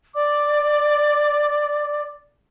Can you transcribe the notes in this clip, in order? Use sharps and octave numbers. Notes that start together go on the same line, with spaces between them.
D5 D6